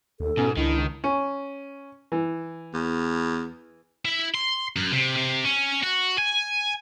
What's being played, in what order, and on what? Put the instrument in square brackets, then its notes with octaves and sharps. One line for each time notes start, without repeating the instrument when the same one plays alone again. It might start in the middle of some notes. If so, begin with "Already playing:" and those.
[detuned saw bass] D#2 [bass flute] A4
[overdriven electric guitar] G#2 [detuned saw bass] B2 [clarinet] C#4
[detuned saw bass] C#2 [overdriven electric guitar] D#3 [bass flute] D4 [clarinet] E4
[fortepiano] C#4
E3
[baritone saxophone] E2
[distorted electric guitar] E4
C6
F#2
C3
C3
C#4
F#4
G#5